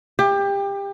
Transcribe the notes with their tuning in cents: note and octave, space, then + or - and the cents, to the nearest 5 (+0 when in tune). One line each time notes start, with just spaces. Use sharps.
G4 +25